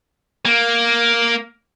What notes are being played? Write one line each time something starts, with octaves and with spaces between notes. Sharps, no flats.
A#3